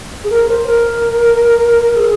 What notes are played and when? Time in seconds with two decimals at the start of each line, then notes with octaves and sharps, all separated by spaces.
0.24 G#4
0.30 A#4
0.48 C5
0.66 A#4
1.95 G#4